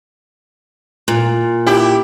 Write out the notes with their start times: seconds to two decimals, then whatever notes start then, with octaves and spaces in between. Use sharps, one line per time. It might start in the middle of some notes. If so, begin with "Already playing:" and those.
1.08 A#2
1.66 E4 G4